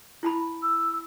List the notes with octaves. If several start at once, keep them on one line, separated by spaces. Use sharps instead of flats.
E4 A5 B5
E6